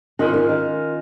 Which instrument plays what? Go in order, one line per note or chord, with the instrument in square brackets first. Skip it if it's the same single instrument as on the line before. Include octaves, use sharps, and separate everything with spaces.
[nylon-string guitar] D#3 [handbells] C#4 F4 A#4
[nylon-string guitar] D#3
D#3